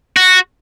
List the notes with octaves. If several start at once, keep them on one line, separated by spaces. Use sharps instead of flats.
F#4